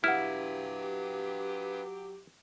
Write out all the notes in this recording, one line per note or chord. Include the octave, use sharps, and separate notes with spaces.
F#3 E4 G4 B4 F5 F#5 F6